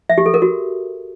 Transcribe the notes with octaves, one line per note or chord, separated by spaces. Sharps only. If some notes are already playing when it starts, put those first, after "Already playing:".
E5
G4
A4
A#4
F#4